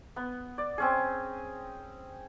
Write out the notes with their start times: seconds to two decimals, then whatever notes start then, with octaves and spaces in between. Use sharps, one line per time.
0.16 B3
0.58 D5
0.78 C4 C#4 G#4